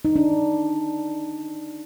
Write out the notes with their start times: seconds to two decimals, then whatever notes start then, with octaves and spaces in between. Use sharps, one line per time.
0.05 D#4
0.16 D4